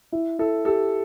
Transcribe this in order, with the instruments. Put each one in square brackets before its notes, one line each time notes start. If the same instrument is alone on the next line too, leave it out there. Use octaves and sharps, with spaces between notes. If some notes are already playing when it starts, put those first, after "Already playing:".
[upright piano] E4
[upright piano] E4 [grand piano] A4
[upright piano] G4 [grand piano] A4